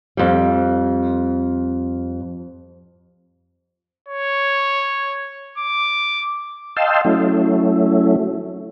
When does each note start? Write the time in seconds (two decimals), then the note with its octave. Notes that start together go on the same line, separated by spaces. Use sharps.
0.17 F2 G3
4.09 C#5
5.58 D6
6.76 D#5 F5 G5 A5 C6 E6
7.05 F#3 A3 C#4 E4